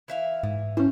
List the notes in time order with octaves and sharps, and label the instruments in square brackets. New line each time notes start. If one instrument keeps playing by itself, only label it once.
[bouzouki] E3 E5 F5
[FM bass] G#2 [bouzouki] E3
[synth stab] E3 C#4 [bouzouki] C5